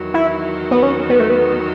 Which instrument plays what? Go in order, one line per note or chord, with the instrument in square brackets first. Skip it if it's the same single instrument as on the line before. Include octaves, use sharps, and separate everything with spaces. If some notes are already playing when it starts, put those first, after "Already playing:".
Already playing: [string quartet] E2 D#3 F#3
[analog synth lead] E4
B3
C#4
B3
A3
B3